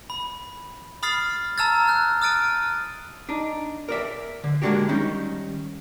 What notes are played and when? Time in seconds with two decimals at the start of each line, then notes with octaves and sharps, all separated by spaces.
0.10 B5
1.03 B5 D#6 F6 A6 C7
1.58 A5 A#5 E6 F6 G#6 A6
1.88 F6 F#6
2.22 D#6 F6 A6 D7 D#7
3.29 D4 D#4
3.89 A#4 D5 E5
4.44 D3
4.62 G#3 A#3 C#4 D4 F#4 G4
4.88 D#3 G3 C#4 D#4